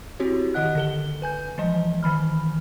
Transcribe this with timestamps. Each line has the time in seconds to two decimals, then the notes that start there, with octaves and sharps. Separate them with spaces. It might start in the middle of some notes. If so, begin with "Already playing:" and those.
0.20 C4 E4 F#4 G4 C#5
0.54 D#3 G4 D#5 F#5 F#6
0.75 D3 A4 G7
1.22 B4 G#5 G6
1.58 E3 F3 G#3 D#5
2.03 D#3 E3 B5 F6